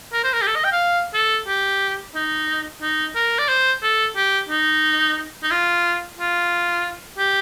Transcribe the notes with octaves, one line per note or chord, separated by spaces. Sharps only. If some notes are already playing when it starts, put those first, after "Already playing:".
A#4
C5
A#4
G4
A4
D#5
G5
F5
A4
G4
D#4
D#4
A#4
D5
C5
A4
G4
D#4
D#4
F4
F4
G4